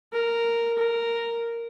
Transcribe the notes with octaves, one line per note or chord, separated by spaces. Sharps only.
A#4
A#4